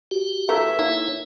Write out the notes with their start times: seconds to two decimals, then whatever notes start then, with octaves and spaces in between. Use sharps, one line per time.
0.11 F#4 G4
0.49 E3 A3 A#4 E5
0.79 A#3 D#4 E4 C#5